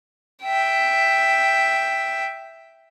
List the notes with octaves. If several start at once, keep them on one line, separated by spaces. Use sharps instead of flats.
E5 G5